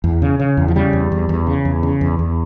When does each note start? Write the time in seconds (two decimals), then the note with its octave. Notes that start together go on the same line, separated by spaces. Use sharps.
0.04 E2
0.22 C#3
0.39 C#3
0.57 E2
0.68 F3
0.76 C#3 G3
0.93 E2
1.12 E2
1.29 E2
1.47 C#3
1.65 E2
1.83 C#3
2.01 E2
2.19 E2